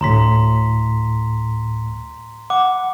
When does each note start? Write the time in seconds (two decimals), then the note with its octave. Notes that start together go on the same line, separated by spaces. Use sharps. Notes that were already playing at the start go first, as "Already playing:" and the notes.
0.01 D2 A2 A#5 C6 B6
2.50 F#5 D6